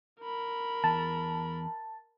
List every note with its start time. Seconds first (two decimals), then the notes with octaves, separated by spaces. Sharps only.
0.21 A#4 B5
0.84 E2 A5